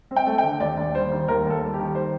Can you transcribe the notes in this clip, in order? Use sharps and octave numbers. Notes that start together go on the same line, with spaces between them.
C4
G5
A3
G5
D3
D#2 D5
D#2
G3 C5
D#3
D#2 A#4
D#2 A4
G3
G4
D#3
C5